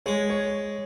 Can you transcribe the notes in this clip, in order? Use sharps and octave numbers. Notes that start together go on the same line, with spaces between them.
G#3 C#5
C#5